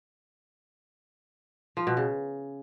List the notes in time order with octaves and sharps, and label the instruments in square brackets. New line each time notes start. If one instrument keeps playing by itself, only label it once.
[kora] F3
B2
C#3